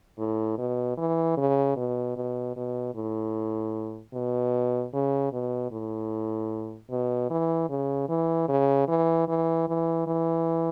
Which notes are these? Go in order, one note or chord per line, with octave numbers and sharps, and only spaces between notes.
A2
B2
E3
C#3
B2
B2
B2
A2
B2
C#3
B2
A2
B2
E3
C#3
E3
C#3
E3
E3
E3
E3